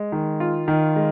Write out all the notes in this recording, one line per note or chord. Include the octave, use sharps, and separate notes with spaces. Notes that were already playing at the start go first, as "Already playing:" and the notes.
Already playing: G#3
D#3
F4
D#3
G#3